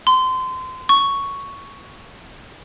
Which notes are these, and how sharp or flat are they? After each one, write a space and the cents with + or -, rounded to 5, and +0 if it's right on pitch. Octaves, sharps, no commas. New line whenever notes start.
C6 -25
C#6 +5